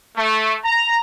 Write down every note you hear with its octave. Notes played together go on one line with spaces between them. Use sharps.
A3
A#5